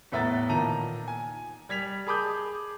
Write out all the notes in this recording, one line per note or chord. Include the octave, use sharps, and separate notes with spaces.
E2 A2 B3 E5 A#5 A6
A#2 D#3 A5 A#5 D#7
G#5
G3 G#6 B6 F7
G#4 A5 B5 D6 D#6 G6